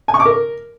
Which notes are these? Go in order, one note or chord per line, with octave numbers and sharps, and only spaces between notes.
G#5
C#6
D6
A#4